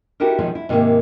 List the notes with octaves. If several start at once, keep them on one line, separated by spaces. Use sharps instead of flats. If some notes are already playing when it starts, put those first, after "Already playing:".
D#4 E4 F#4 G4 A4 A#4
B2 D#3 F3 G#3 C#4
E4
G#2 C3 D#3 A3 A#3